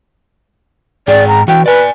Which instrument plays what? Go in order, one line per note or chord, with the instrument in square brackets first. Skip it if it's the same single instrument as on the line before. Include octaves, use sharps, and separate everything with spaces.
[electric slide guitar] G#2 G#4 G5 [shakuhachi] D5
[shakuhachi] A#5
[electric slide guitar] E3 F#4 [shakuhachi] G5
[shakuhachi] B4 [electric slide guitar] D5 G#5